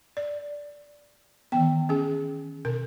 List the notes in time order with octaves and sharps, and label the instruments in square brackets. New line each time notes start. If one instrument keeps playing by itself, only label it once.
[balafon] D5
[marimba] D#3 E3 B3 [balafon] G5
[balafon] C#4 G#4
[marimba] B2 [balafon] A#4